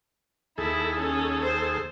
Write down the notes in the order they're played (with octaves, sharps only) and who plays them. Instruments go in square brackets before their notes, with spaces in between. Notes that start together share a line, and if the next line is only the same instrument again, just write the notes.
[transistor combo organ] D#2 G#4 A4 [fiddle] E4
[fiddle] C#4
C5